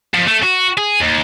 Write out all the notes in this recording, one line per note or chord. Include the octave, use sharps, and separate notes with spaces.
F2
A3
F#4
G#4
D#2